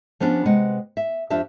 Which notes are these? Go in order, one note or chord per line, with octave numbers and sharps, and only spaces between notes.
F3 B3 C#4 D4 F#4 G4
C3 G#3 B4 F#5 G5
E5
F2 D4 F4 G4 E5 A5